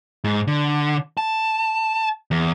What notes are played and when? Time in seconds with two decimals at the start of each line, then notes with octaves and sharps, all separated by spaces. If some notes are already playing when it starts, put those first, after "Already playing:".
0.24 G#2
0.47 D3
1.17 A5
2.31 E2